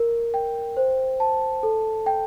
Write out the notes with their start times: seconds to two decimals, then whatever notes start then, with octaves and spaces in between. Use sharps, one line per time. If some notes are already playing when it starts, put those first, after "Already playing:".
Already playing: A#4
0.34 G5
0.77 C5
1.20 A5
1.63 A4
2.06 G5